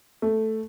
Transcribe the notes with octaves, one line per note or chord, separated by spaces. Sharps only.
A3